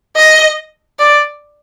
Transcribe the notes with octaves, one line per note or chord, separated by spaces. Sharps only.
D#5
D5